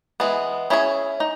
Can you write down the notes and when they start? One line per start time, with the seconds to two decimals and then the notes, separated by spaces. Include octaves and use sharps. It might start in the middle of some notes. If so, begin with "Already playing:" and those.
0.20 E3 G#3 B3
0.70 C#4 E4 G#4 C#5
1.20 D#4